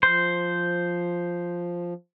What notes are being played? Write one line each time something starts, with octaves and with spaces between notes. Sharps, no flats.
F3 C5